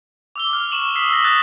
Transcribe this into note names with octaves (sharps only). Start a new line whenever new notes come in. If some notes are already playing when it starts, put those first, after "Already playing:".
D6 E6 G7
F6
C#6 E7 F#7
D#6 E6 B6 C7 F#7
E6 A#6
D#6 F#6 A6